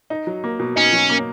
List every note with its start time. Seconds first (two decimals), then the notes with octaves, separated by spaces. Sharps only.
0.10 D#4
0.27 F#3
0.44 A#3
0.60 B2
0.76 C#4 D#4
0.93 F#3
1.09 A#3